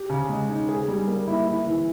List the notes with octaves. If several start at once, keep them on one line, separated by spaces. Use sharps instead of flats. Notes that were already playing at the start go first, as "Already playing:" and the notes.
Already playing: G4
C#3
G#3
D#4
G#4
G3
A#3
E4
E4
E3